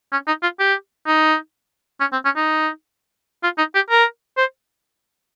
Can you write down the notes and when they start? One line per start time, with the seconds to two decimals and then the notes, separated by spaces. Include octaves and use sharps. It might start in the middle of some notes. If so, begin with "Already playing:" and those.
0.12 C#4
0.28 D#4
0.43 F4
0.60 G4
1.07 D#4
2.01 C#4
2.13 C4
2.25 C#4
2.36 D#4
3.44 F4
3.58 D#4
3.75 G4
3.90 A#4
4.37 C5